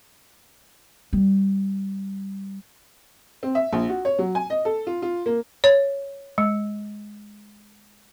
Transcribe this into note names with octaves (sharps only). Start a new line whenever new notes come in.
G3
C4
E5
A#1
F#4
C#5
F#3
G#5
D#5
A4
F4
F4
A#3
C#5
G#3